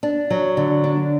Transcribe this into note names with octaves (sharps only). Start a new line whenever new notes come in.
D4
F#3
D3
D4